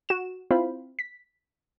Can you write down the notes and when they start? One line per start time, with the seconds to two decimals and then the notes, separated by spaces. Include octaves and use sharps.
0.09 F#4 E7
0.51 C4 E4 F4 C5 F5 B5
0.99 B6